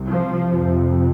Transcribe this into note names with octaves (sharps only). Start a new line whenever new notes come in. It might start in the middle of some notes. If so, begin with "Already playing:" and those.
Already playing: C2 C3
F3
C3
F2